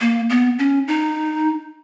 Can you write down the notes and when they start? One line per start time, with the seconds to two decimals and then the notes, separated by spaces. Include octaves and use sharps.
0.01 A#3
0.30 B3
0.59 C#4
0.88 D#4